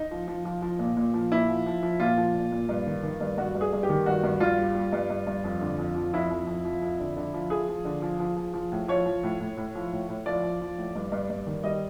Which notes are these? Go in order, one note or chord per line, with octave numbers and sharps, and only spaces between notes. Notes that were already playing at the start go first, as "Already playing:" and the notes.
Already playing: D#4
F3
F3
F3
F3
A#2
A#2
F3
A#2 E4
F3
F3
F3
A#2 F4
F3
A#2
A#2
G2
D#3
D#3
G2
G2 F#4
G2
G#4
G2
G4
D#3
G2 F#4
G2
G2 F4
G3
G3
G2
G2
G2
F2
D3
F2
F3
F2 E4
F2
F2
F3
F2
D3
D3
F3
F3 G#4
F3
D3
F3
F3
F3
F3
A2
F3 C#5
F3
A2
A2
A2
F3
A2
A2
F3 D5
F3
F3
A2
G2
G2
G2
D#3
G3 D#5